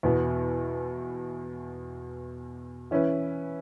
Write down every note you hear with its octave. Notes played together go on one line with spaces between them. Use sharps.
E2 B2 B3
E3 C#4 E4 B4